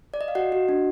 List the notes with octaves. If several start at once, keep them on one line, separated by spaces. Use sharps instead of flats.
D5
D#5
F5
F#4 D#5 F#5
F#4
D4